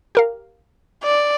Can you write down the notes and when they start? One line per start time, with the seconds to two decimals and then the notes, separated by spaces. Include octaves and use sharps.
0.15 G4 A#4 F5
1.04 D5